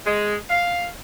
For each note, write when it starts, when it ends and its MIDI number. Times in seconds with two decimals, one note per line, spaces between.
0.06 0.36 56
0.50 0.87 77